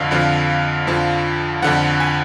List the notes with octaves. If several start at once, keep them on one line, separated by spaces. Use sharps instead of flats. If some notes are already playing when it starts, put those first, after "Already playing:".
Already playing: F2 D3 F3 F5
F2 D3 F3
F2 D3 F3
F2 D3 F3 F#5
G#5